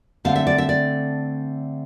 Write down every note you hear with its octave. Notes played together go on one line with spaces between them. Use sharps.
D3 A3 C4 F5
E5
D5
E5
D5